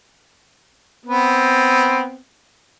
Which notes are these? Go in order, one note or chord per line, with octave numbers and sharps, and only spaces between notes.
B3 C4